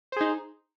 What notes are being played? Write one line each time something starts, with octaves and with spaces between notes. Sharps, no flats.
D#4 G#4 C5